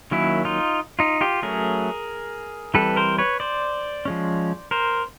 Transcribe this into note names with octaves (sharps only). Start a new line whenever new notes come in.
D#3 F#3 A#3 C#4 E4
D#4 F4
D#4 F4
F4 G4
F#3 A3 C#4 G#4 A#4
E3 G3 C4 A4 B4
A#4 C5
B4 C#5
C5 D5
F3 G#3 C#4
A#4 C5